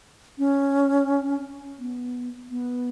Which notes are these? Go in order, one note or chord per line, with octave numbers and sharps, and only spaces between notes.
C#4
B3
B3